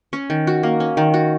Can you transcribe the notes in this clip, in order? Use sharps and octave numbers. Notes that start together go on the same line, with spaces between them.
C#4
D#3
F#4
A#3
C#4
D#3
F#4